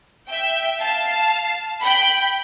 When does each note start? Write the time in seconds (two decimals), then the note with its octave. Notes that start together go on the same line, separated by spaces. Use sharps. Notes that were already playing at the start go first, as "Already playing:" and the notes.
0.29 E5 G5
0.80 F5 A5
1.82 G5 B5